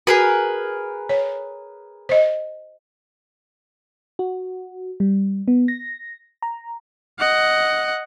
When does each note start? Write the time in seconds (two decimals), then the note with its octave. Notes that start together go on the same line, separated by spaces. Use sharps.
0.07 F#4 G#4 A#4 B4
1.09 C#5
2.09 C5 D#5
4.19 F#4
5.00 G3
5.48 B3
5.68 A#6
6.42 A#5
7.19 D#5 F#5